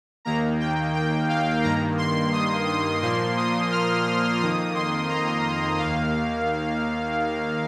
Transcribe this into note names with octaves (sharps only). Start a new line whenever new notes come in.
D#2 D#3 A#3 A#5
G5
G5
F5
G2 D#3 A#3 A#5
C6
D#6
D#6
A#2 F3 A#3 C6
D#6
F6
F2 D#3 A#3 D#6
C6
A#5
D#2 D#3 A#3 F5